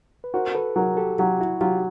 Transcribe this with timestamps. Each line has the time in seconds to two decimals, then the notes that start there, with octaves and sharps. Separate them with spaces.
0.24 B4
0.34 F#4 A#4 C5
0.55 A4 B4
0.76 F#3 G#4 A#4
0.97 G4 A4
1.19 F#3 F4 G4
1.40 E4 F#4
1.61 F#3 F4 G4